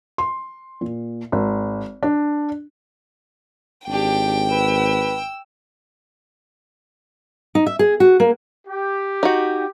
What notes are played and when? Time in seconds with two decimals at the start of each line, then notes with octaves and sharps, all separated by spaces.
0.18 C6
0.81 A#2
1.32 G#1
2.03 D4
3.87 G#1 D4 G4 G5
4.50 B4 E6
7.55 D#4
7.66 E5
7.79 G#4
8.00 F#4
8.20 A#3
8.67 G4
9.23 D#4 F#4